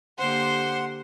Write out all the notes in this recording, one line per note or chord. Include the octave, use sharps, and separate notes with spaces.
D3 A#3 G4 C5 F#5 C6